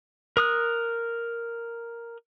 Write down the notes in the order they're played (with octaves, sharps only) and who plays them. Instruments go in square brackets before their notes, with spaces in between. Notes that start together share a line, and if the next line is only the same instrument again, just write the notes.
[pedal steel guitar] A#4 D#6 F#6